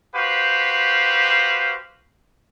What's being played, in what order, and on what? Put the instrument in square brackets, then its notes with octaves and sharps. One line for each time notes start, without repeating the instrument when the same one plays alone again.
[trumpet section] F#4 G4 B4 C5 F5